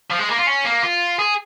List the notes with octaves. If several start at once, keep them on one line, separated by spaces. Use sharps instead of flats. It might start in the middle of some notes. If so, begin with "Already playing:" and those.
F3
G#3
A#3
F4
C#4
A#3
F4
G#4